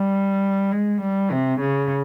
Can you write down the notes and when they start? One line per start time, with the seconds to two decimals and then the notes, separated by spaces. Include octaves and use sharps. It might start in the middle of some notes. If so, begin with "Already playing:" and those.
Already playing: G3
0.72 G#3
1.01 G3
1.31 C3
1.60 C#3